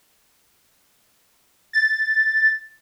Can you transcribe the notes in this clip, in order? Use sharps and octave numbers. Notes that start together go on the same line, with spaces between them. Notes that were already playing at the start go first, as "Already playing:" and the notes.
A6